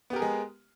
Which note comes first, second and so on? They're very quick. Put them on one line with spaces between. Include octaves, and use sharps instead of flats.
B3 G4 A#4 G#4 G#3